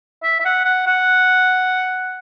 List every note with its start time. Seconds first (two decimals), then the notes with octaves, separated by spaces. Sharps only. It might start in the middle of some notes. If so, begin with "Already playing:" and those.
0.23 E5
0.40 E5
0.45 F#5
0.65 F#5
0.86 F#5